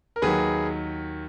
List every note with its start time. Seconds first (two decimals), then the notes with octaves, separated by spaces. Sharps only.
0.16 A#4
0.22 D#2 D#3 F#3 G#4 B4